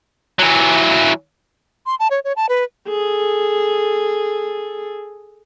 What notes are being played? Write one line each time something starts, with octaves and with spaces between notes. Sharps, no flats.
E3 F#3
C6
A5
C#5
C#5
A5
B4
G#4 A4